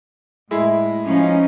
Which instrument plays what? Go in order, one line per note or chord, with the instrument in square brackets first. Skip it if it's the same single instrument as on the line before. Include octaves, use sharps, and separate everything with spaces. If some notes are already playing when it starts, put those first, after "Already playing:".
[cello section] A2 [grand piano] G#3 E4
[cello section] F3 C#4 D#4